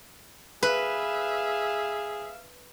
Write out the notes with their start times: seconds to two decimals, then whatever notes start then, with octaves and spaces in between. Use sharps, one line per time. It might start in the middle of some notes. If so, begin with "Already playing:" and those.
0.63 G#4 B4 E5 F5